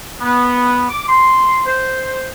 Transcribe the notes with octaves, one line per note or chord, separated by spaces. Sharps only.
B3
D6
C6
C5